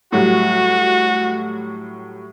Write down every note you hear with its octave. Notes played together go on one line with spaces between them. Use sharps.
A2 F#3 G3 F#4